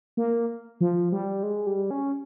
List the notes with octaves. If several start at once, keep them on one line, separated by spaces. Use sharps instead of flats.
A#3
F3
G3
G#3
G3
C#4